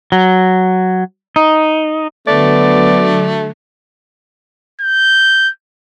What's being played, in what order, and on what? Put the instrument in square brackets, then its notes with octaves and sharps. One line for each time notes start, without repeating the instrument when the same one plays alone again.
[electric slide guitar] F#3
D#4
[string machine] D3 F#3 [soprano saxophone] A3 [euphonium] B3 [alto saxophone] D5
[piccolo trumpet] G6